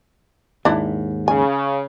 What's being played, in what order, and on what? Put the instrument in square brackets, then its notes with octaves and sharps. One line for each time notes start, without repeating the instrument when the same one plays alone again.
[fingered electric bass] D#2 G#2 [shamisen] D4 E4
[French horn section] C#3 [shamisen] G#5